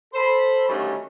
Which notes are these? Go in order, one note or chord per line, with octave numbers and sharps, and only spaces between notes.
A4 C5 B5
D3 D#3 F#3 G3 A3 C#4